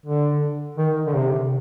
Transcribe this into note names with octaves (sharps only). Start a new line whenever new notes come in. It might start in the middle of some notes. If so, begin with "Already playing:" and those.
D3
D#3
D3
C3